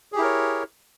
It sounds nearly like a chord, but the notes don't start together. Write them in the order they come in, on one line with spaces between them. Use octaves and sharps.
G#4 G4 E4 A#4 C#5